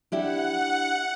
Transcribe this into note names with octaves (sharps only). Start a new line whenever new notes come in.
D4 E4 G4 F#5